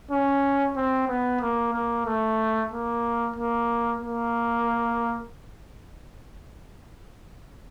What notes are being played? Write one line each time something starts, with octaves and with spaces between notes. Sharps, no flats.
C#4
C4
B3
A#3
A#3
A3
A#3
A#3
A#3